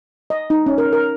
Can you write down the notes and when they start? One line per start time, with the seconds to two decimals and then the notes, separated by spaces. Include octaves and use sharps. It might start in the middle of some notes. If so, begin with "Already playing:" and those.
0.30 D#5
0.50 D#4
0.66 C#4
0.78 A#4
0.93 A#4